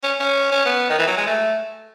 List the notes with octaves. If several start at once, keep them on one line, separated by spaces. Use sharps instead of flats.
C#4
C#4
C#4
B3
D#3
E3
F#3
G#3
A3